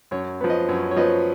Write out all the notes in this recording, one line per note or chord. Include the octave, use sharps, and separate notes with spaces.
F#2 C#5
F3 B3
D#5
F#2 C#5
C#5
F3 B3 D#5